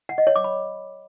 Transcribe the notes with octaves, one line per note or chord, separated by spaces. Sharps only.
F#5
D#5
C#5
D6
B5